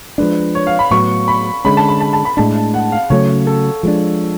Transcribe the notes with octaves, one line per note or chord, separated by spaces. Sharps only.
F3 G#3 D4 B4
C#5
F5
B5
A2 F#3 B3 C#6
B5
D3 G#3 C#4 B5
A5
B5
A5
A5
B5
A2 G#3 D4 A5
F#5
F5
C#3 F#3 A3 C#4 C#5
A4
F3 G#3 D4